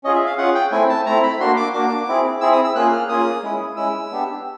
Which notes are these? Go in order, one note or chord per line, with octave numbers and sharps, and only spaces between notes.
C#4 F4 G#4 D#5
E5
F5
C#4 F4 G#4 F#5
G5
A3 C4 E4 G#5
A5
A3 C4 E4 A#5
B5
A#3 D4 F#4 C6
D6
A#3 D4 F#4 D6
C4 E4 G#4
C4 E4 G#4 E6
D#6
E6
A#3 C#4 F4 G#4 F#6
F6
A#3 C#4 F4 G#4 D#6
G#3 C#4 E4
G#3 C#4 E4 E6
B3 D4 G4